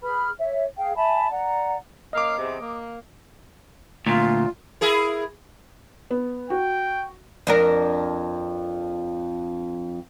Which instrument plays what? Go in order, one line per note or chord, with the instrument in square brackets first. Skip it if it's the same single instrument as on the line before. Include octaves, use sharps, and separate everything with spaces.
[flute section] G#4 B4 B5 F6
C#5 E5
G#4 F5 G5
E5 G#5 A5 B5
D5 F#5 A#5
[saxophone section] A#3 C#4 F5 [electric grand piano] D#5 D6
[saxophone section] E2 C3
A#3
[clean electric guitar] D2 A#2 [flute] F4
[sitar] E4 G#4 A#4
[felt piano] B3
[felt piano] F#4 [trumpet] G5
[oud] F2 D4 A#4